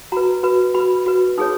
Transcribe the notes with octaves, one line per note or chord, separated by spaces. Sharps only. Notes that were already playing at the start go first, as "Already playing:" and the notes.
F#4 B4 A#5
F#4 B4
F#4 B4 B5
F#4 B4
D#4 G#4 C#5 D#6